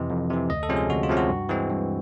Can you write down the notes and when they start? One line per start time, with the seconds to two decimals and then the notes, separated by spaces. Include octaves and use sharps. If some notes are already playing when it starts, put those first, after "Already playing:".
Already playing: F2 C3 E3 D#5
0.10 F2
0.30 C3 E3
0.49 D2 D#5
0.63 A4
0.69 C3 F3 G#3 C#4
0.77 G#4
0.90 D2 F#4
1.03 F4
1.09 C3 F3 G#3 C#4
1.17 F#4
1.29 G2
1.49 E3 G#3 C4
1.70 G2